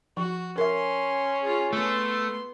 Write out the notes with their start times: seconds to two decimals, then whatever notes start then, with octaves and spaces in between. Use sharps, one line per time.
0.17 F3 F#4
0.58 C#4 A#4 E5 C6
1.41 F4 G#4
1.73 A3 B3 C6